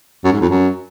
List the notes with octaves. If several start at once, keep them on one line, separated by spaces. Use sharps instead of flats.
F#2
G#2
F2
F#2